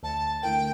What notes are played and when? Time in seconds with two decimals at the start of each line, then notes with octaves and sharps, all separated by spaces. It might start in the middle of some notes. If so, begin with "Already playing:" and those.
0.03 D2 A5
0.43 D3 A3 E4 A#4 G5